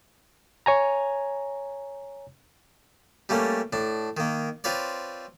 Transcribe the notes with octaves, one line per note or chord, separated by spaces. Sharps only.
C#5 G#5 A#5
G3 A3 A#3 C#4
A2 D4
D#3 A#3
C4 F4 B4 C#5 D5